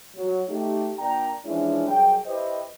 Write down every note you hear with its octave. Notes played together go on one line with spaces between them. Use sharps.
F#3
A3 D#4 G4
A#2 D4 G5 A#5
E3 F3 G#3 C#4 D4 E4
C2 F#3 G#4 G5
E4 G4 B4 C5 D#5